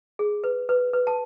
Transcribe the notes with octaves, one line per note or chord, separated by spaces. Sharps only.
G#4
B4
B4
B4
A5